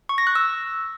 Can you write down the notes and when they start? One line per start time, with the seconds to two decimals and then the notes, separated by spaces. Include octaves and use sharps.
0.09 C#6
0.18 A#6
0.27 F#6
0.35 E6